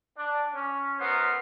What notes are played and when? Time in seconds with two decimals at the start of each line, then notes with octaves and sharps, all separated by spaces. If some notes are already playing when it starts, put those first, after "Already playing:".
0.17 D4
0.54 C#4
1.00 F#2 F#3 B3 A#4 C5